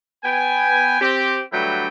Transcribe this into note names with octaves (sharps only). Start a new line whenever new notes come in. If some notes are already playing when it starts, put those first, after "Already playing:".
B3 G5 G#5
C4 G4
G2 D3 F#3 A3 E4 G5